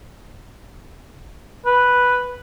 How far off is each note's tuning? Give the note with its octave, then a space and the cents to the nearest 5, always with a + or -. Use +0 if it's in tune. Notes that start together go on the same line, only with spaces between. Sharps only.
B4 -5